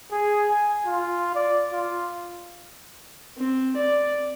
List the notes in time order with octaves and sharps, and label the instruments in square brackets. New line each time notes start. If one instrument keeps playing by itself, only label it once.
[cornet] G#4
G#5
F4
D5
F4
[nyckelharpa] C4
D5